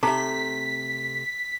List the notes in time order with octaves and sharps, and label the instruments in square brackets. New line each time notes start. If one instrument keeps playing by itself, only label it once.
[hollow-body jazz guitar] C3 A3 [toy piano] D#4 A4 A#5 [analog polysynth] B6